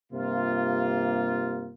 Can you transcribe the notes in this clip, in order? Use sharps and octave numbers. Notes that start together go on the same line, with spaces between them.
G2 C3 A#3 F4